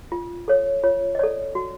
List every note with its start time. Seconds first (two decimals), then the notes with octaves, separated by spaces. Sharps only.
0.12 F4
0.48 A4 C#5
0.83 F4 C#5
1.15 D#5
1.19 A4 C#5 D5
1.55 F#4